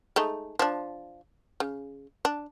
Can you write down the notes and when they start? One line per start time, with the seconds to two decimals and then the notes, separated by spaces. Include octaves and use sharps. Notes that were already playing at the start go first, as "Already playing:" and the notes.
0.16 G#3 A3 D#4
0.59 F3 D4
1.60 C#3
2.25 D4